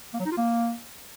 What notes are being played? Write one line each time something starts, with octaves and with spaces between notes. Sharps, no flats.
A#3
F#3
D#4
F4
A#3